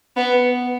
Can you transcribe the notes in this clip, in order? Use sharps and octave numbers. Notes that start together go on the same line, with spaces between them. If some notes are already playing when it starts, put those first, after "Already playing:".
B3